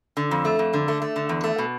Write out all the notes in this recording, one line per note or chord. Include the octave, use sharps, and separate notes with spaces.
D3
F2
A3
F2
D3
A3
A3
D3
E2
A3
B2